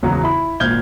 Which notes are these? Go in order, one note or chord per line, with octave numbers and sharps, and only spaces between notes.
G#1 E2 C#3 F#3 A#5
E4 B5
G#1 A#2 F6 G6 G#6 G7